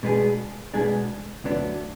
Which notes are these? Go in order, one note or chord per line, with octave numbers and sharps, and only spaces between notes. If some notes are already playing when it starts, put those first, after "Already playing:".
B2 G#3 B3 D4 G#4
B2 G#3 B3 D4 G#4
D2 D3 F#3 B3 D4